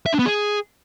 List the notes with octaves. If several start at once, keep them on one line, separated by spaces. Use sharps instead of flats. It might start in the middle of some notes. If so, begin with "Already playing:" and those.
E5
D4
B3
G#4